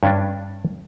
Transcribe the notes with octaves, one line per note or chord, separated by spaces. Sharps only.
G2 C#4 D4